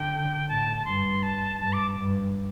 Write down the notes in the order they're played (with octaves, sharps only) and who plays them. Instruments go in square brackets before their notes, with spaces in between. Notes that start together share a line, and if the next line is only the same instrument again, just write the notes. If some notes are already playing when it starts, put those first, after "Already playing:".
Already playing: [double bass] D3 [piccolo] G5
[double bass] A2 [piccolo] A5
[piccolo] A5
[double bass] G2 [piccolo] C6
[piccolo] A5
[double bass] G2 [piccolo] A5
[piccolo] D6
[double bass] G2